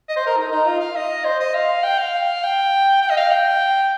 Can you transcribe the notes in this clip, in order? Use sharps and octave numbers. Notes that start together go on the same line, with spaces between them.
D#5
C5
A#4
D#4
D#4
F4
F5
D#5
C5
D#5
F5
G5
F5
G5
G5
D#5
F5
G5